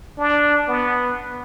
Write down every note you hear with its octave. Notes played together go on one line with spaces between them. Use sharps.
D4
B3